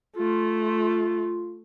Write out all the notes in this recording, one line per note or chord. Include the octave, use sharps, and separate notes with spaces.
A3 F4